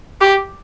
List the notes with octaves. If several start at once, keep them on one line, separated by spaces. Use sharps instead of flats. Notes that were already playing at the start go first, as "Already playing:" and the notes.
G4